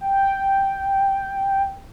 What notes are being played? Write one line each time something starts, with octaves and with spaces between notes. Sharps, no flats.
G5